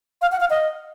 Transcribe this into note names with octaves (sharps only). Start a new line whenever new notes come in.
F5
F#5
F5
D#5